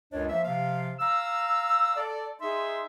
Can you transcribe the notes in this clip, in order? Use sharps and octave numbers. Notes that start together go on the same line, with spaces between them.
C#2 F#2 D4 C#5 D#5
F3 A#3 E5
C3 F3 F5
F5 A#5 E6
A4 D5
D#4 G#4 E5 C6